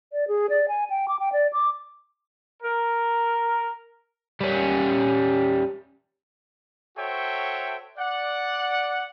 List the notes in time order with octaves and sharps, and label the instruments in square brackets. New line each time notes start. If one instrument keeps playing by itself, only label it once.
[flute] D5
G#4
D5
G#5
G5
D6
G5
D5
D6
[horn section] A#4
[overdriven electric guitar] G3 C#4
[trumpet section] F#4 A4 C5 C#5 E5 G5
D5 F#5